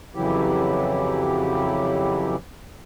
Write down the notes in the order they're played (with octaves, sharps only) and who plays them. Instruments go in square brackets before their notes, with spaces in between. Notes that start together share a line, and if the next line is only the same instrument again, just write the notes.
[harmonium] F2 C#3 E3 F#3 E4 G4